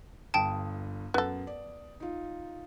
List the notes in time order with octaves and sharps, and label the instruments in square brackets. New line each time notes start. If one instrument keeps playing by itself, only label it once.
[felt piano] G1 G2 D#6 [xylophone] G5 A5
[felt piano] F#2 [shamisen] B3 A4
[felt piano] D5
D#4 F4